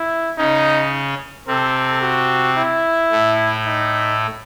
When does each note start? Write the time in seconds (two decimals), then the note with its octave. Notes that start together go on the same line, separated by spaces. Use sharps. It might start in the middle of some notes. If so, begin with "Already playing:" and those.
Already playing: E4
0.38 C#3 C#4 D#4
1.47 C3 C4 A4
2.02 F#4
2.57 E4
3.12 A2 A3
3.66 D#4